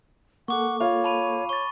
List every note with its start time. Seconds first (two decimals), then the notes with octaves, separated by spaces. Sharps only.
0.48 A#3 A4 F#5 C#6 D6
0.80 F4 C#5 B5
1.04 A5 B5 D#7
1.49 C#5 C#6 A6